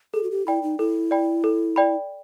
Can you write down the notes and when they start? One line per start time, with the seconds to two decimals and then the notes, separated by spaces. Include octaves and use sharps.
0.14 G#4 A4
0.23 F#4
0.31 G4
0.47 E4 D5 G5 B5
0.63 D#4
0.79 E4 A4
1.11 D5 G5 B5
1.44 A4
1.76 D5 G5 B5